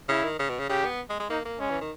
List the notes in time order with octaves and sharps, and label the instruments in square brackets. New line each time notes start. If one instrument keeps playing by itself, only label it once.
[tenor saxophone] C#3 [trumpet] E4
[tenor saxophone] D#3
C#3
B2
C#3
[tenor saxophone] C#3 [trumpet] G4
[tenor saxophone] B3
G#3
G#3
[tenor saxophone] A#3 [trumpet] D#4
[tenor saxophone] A#3
[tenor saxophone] G#3 [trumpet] C#4
[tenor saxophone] E3
D#3